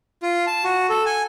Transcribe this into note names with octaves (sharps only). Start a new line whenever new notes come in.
F4
A5
F#4
A4
G#5